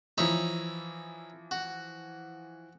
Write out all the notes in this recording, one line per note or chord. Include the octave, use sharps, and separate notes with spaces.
E3 F3 D#4 E4 C#5
F#4